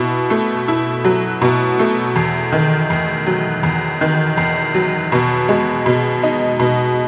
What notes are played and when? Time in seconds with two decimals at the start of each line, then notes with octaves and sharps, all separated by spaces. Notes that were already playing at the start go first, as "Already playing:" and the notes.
Already playing: B2 E4
0.30 A3
0.68 E4
1.05 F#3
1.42 B2
1.79 A3
2.16 E2
2.53 D#3
2.90 E2
3.27 F#3
3.63 E2
4.01 D#3
4.37 E2
4.74 F#3
5.12 B2
5.49 G#3
5.86 B2
6.23 D#4
6.60 B2